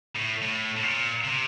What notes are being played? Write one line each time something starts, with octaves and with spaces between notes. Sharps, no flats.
A2
A2
A2
A#2
C3